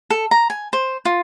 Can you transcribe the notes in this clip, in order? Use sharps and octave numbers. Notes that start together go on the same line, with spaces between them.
A4
A#5
G#5
C5
F4